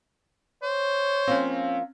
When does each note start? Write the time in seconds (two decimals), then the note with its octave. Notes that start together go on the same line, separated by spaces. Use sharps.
0.63 C5 C#5
1.28 F3 A#3 C4 C#4